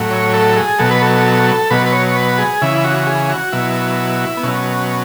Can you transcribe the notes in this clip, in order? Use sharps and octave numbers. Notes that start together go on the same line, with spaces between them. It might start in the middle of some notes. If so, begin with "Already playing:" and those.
Already playing: A2 F#3
C#5
A4
G#4
B2 F#3 A4
B4
A4
B2 F#3 B4
B4
C#5
B4
G#4
C#3 E3 E4
F#4
G#4
F#4
B2 F#3 E4
B3
B2 F#3 C#4